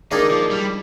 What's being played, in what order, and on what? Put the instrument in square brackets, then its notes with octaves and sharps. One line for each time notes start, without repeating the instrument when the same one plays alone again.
[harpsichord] D#3 A#3 D4 G#4 D5 [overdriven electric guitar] D#4
[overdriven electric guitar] F3
G3